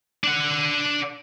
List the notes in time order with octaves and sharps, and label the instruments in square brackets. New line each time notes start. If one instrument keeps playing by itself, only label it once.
[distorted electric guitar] D4 F#5